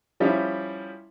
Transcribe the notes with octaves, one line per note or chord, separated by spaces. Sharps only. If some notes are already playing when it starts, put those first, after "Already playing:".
F3 G3 C#4 E4